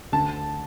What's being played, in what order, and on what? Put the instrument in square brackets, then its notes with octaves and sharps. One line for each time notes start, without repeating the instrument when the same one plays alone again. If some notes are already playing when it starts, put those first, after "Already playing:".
[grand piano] D2 A5